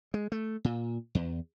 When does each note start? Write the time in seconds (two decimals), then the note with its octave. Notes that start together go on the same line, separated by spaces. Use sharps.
0.14 G#3
0.32 A3
0.65 A#2
1.15 E2